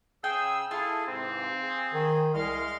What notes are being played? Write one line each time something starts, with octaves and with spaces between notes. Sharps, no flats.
C#3 G#4 G5 E6
E4 F4 G#4 A4
G#2 C3 E3 C4
G#4
D#3
C2 G#3 F5 C6 F6